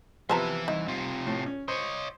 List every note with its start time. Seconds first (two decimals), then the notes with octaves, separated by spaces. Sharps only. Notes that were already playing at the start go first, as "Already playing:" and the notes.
0.29 C3 E3 F3 B3 C5 E5 A5 A#5
0.68 C2 D#4
0.88 C3 F4
1.27 A2
1.46 C#4
1.68 C5 C#5 D#5